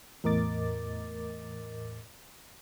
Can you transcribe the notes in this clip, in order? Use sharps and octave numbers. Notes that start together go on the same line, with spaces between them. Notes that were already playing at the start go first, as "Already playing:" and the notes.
E2 A2 A#4 D#5 D6 A6